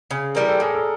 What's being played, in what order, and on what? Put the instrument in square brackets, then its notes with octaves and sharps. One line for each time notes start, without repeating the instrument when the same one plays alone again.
[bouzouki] C#3 [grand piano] G#4
[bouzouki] E3 G3 C4 [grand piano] A#4
[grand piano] A4
[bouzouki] A2 [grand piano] G#4
[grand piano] A4